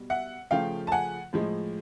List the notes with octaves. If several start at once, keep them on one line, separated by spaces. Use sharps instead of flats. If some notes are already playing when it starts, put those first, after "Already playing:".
Already playing: B2 G3
E5 F#5
C#3 F3 A3 F5 G5
A5
F#5 G#5
A2 F3 G#3